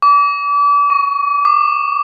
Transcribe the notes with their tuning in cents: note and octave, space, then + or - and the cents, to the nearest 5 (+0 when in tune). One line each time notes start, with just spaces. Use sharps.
D6 -35
C#6 +25
D6 +30